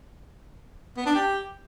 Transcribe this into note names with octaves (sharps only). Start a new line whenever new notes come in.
B3
D4
G4